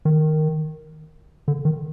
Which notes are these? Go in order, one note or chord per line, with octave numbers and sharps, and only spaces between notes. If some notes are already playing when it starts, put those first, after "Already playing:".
D#3
D3
D#3